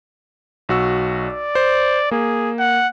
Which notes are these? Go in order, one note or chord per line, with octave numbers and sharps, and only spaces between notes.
B1 F#4 E6
D5
C5
A#3 G#4
F#5